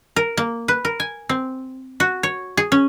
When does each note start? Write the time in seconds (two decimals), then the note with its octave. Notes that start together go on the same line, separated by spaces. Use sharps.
0.16 A#4
0.37 A#3
0.68 B4
0.85 A#4
1.00 G#5
1.29 C4
2.00 F#4
2.23 C#5
2.57 G#4
2.72 C#4